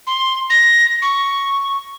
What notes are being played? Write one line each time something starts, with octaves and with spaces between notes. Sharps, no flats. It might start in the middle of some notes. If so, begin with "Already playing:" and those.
C6
A#6
C#6